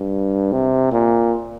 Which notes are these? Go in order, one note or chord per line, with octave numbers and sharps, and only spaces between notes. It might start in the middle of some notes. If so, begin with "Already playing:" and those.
Already playing: G2
C3
A#2